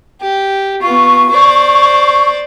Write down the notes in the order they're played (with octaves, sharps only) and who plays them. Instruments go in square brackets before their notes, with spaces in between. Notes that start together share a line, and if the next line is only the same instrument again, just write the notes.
[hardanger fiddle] G4
[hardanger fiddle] B3 F4 [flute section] C#6
[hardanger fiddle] C5 D5